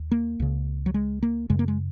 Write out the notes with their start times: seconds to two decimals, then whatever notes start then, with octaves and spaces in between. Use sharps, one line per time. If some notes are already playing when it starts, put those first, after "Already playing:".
Already playing: D#2
0.11 A#3
0.40 C#2 C#3
0.86 F#3
0.94 G#3
1.23 A#3
1.50 F#2 C#3 G#3
1.59 A#3
1.68 G#3